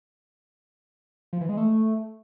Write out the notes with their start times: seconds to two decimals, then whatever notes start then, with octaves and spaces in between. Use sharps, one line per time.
1.33 F3
1.41 E3
1.49 G#3
1.57 A3